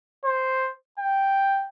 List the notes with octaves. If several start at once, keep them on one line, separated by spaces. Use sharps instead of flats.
C5
G5